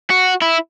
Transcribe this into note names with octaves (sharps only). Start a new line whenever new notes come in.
F#4
E4